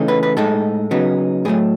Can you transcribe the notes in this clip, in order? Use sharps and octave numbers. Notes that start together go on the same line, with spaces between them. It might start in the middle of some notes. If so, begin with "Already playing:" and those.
Already playing: C#3 E3 A3 D#4
B4
B4
A2 G#3 D#4 A4
C#3 F#3 B3 D#4
A2 F#3 A3 G#4